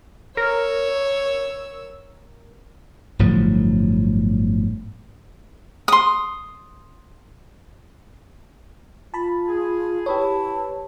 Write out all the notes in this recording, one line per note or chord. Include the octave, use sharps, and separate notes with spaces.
A#4 C#5 E6
G1 A2 F3 F#3
C6 D#6
F4 A5 B5
G#4
E4 G4 B4 C#5 A5